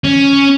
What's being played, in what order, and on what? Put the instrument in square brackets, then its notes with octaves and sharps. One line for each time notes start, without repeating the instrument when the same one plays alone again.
[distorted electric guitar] C#4